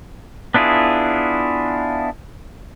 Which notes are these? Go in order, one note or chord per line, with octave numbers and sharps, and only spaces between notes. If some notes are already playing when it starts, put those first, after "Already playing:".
B3 D4 E4 F4 G#4